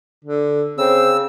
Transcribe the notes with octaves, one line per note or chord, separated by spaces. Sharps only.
D3
C#3 C4 E6